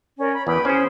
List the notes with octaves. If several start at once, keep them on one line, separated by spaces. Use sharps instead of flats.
C#4 A#4 D5
B5
E2 B4 G5 B5
C#4 G#4 C5 G5